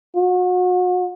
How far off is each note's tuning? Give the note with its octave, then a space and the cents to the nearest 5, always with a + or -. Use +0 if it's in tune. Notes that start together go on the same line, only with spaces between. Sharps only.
F#4 -35